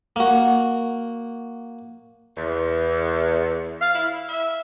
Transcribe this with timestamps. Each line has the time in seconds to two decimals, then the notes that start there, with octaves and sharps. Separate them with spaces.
0.16 A#3 F#4
2.36 E2
3.80 F5
3.95 E4
4.28 E5